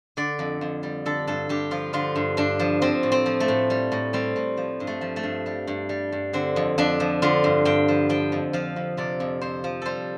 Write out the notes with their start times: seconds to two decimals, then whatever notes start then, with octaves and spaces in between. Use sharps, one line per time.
0.17 D3 D5
0.39 F2
0.61 F2
0.83 G3
1.06 D3 A4
1.27 G2 A4
1.49 G2 G4
1.71 F3 F4
1.93 D3 F4
2.16 G2
2.37 G2 D4
2.60 F3
2.82 F3 C4
3.03 A2
3.12 C4
3.26 F3
3.40 A3
3.48 A2
3.70 G3
3.92 A2
4.13 G3 C4
4.36 A2
4.57 F3
4.80 G2
4.87 A3
5.01 F3
5.16 A3
5.23 G2
5.46 G3
5.67 G2
5.89 G3
6.12 G2
6.33 D3 C4
6.56 F2
6.78 F2 D4
7.00 F3
7.22 D3 F4
7.44 G2
7.65 G2 G5
7.88 F3
8.09 F3 G5
8.32 F2
8.53 F3 F5
8.76 F2
8.98 C3 D5
9.20 F2
9.41 F2 C5
9.64 F3
9.82 G3 A4 C5